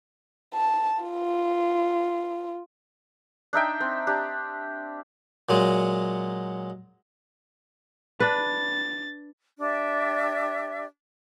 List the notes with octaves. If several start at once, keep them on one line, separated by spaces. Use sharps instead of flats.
A5
F4
D4 D#4 E5 G5
C4
D4 G4
A#2 F#3 G#3
D4 B4 A6
D4 G4 D5 E5